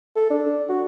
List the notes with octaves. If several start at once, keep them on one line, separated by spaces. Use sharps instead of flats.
A4
D4
F#4